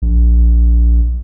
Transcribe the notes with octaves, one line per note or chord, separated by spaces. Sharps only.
A#1